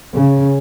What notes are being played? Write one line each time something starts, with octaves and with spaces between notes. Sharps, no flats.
C#3